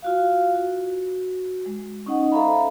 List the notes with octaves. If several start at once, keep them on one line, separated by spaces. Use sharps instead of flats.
F4 F#4 F5
F#4
G#3
C#4 D#4 D#5 F#5
A4 C5 E5 F5 A#5 B5